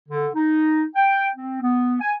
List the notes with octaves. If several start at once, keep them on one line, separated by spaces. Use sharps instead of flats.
D3
D#4
G5
C4
B3
G#5